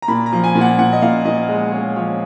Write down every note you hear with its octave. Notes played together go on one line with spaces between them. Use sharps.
A#5
A#2 B5
A#5
F3
G#5
A#2
F#5
A#2 F#5
D#5
A#2 F5
A#2 D#5
G#3
G#3 C#5
F3 C#5